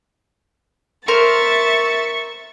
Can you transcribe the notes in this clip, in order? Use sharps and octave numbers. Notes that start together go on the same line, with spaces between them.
A#4 C5 E5 C#6 A6